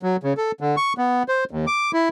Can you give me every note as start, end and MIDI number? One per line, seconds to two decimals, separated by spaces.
0.03 0.16 54
0.23 0.33 49
0.37 0.52 69
0.61 0.76 50
0.77 0.93 85
0.98 1.23 59
1.28 1.44 72
1.51 1.65 39
1.67 1.91 86
1.93 2.09 64